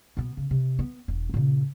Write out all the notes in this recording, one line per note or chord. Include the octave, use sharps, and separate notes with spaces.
B2 B3
C#3
C3
B3
E1
A#2 C#3